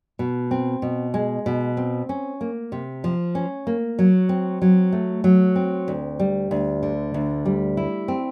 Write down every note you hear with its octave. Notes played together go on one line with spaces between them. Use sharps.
B2
C4
B2
G#3
B2
C4
C#4
A#3
C3
F3
C#4
A#3
F#3
C4
F#3
A3
F#3
C4
D2
G3
D2
D3
D2
G3
E4
C4